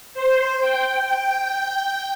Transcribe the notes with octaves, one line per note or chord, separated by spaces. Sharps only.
C5
G5